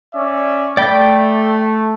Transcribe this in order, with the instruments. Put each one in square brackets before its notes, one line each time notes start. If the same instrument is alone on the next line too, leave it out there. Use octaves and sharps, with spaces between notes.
[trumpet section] C#4 D5 E5
[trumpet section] A3 [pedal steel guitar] D5 G5 B5